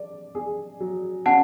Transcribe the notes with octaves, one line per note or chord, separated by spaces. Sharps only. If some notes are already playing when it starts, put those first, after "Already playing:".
Already playing: D5
G#4
F#3
C#4 F#5 A5